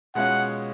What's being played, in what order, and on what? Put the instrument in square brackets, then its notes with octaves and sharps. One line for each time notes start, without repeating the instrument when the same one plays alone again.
[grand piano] B2 G#3 C#4 F4 [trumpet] F#5